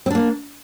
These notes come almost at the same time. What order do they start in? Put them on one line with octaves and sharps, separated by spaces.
C4 D4 A#3